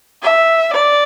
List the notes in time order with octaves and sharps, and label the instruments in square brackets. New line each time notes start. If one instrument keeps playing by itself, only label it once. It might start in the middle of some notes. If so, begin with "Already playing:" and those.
[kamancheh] E5
D5